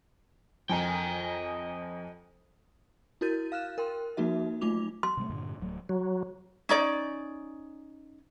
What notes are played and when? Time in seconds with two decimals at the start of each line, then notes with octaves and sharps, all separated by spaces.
0.70 F2 D#5 G5 G#5 A#5
3.21 E4 F#4 A#4 G6 A6 D#7
3.52 F5 F6 F#6 E7
3.78 A#4 G5 C6
4.17 F3 A#3 D#4 F#4 E5
4.61 F#3 A3 D#4 F4 D6 F7
5.03 C6
5.17 C3 G3 A3
5.30 G2 A#2 D3
5.60 D1 F#3 A3
5.89 F#3
6.69 C#4 D#4 D5